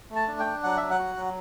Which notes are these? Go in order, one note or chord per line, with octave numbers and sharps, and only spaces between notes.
A3
A5
D4
G5
D4
F#3 F#5
F#3 E5
F#5
F#4
F#3